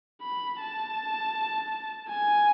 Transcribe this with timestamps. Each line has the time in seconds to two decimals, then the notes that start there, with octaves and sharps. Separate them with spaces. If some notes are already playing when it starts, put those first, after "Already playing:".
0.22 B5
0.60 A5
2.09 G#5